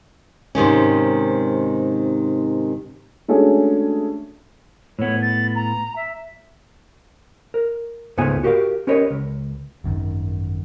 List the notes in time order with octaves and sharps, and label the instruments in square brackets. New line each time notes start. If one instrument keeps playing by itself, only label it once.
[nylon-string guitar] G#2 C3 D#3 C#4
[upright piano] G#3 A3 C#4 D4 F#4 G#4
[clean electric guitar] A2 B3 [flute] C#5
[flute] A6
A#5
E5
[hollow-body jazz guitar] A#4
C#2 G#2 A3 B3 F4 G#5
F#4 G4 A#4 D#5 F5
C#4 G4 A#4 B4 C#5 D#5
C#2
[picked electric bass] G#1 F#2 D#3